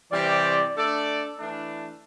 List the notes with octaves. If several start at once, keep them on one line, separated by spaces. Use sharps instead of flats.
C3 E3 G3 C4 G4 D5
A3 D4 A4 D5
E3 A3 D4